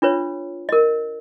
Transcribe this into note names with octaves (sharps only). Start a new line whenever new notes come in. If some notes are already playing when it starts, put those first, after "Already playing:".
D4 F4 B4 C#5
A#4 D#5